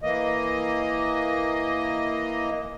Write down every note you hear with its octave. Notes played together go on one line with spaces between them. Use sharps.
E3 A#3 D#5